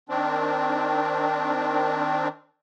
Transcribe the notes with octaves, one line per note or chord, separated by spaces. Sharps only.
D#3 C4 D4